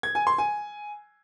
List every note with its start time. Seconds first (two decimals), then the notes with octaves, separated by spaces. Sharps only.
0.03 G#6
0.15 G#5
0.27 C6
0.38 G#5